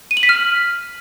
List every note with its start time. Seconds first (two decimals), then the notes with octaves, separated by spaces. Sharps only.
0.11 D#7
0.17 F#7
0.23 B6
0.29 F6